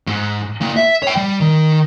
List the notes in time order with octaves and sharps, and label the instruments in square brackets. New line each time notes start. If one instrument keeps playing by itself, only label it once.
[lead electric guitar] G#2
A#3 E4
E5
C#5 G5
G3
D#3